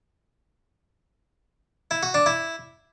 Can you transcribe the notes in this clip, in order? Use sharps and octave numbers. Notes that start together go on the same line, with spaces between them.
E4
F#4
D4
E4